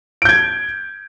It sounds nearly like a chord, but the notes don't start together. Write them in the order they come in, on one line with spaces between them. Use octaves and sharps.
D7 G6 G#6